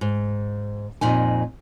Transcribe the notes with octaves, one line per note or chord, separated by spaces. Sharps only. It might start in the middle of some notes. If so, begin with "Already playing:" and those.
G#2
F2 A#2 D#4 G#5